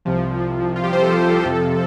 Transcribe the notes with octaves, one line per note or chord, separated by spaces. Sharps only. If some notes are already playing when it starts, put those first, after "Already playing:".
C2 C3 F3
F4
G4
C5
A4
F2 C3 F3